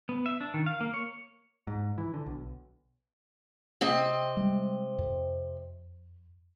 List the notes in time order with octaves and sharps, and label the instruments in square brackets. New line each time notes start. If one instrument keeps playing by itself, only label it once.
[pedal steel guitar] B3
E5
D4
D#3
F5
A#3
C#5
[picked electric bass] G#2
E3
D3
B1
[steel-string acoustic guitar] C3 C4 D#5
[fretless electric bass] G3 G#3
F2